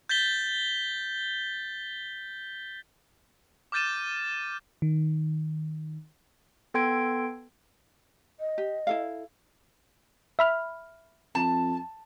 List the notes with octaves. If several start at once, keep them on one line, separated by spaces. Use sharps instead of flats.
G6 A6 B6 G7
D6 F6 G6 A6 D#7 E7
D#3
B3 A4 G5 C6 G#6 D7
D#5
G4
E4 A4 F5
E5 B5 F6
F2 A5